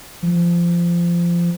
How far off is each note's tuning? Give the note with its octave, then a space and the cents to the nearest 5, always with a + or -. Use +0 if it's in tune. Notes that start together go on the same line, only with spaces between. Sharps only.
F3 -20